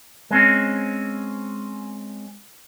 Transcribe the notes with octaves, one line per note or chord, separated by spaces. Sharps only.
G#3 C4 C#4